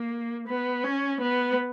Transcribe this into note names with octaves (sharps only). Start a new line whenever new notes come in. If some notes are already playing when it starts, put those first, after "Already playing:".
Already playing: A#3
B3
C#4
B3